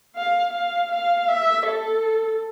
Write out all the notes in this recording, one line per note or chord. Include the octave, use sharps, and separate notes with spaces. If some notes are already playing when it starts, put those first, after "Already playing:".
F5
F5
F5
E5
A4